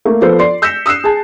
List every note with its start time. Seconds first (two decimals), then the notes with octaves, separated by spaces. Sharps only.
0.05 A3 A#3
0.21 F3 B3 A4 C5
0.39 D5 C6 C7
0.62 E6 G6 A#6 B6 C#7 E7
0.86 D#6 E6 F#6 C7 E7
1.04 G#4 A5